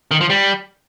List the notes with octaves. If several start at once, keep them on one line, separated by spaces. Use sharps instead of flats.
D#3
F3
G3